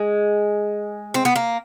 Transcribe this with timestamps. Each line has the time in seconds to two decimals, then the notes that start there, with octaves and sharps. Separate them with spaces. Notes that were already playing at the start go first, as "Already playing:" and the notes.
Already playing: G#3
1.14 C4
1.25 B3
1.36 A#3